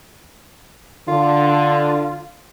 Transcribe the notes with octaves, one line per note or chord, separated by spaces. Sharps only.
D3 F4